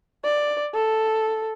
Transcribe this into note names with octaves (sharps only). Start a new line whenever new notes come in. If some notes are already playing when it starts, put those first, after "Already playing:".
D5
A4